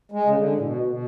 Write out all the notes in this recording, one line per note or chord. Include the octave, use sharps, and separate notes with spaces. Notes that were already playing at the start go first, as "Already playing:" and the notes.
G#3
C#3
D3
A2
B2
B2